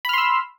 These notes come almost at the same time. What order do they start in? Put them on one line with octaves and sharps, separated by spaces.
B5 F6 C6 E6